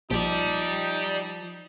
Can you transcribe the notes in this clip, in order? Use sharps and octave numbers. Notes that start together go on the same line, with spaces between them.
A#1 F3 D#4 G4 D5